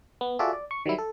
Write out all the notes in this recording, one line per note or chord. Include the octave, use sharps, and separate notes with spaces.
B3
F4 F#4 G#4 A4 D5 E5
D5
C#6
D#3 F#3 G3 E4
A4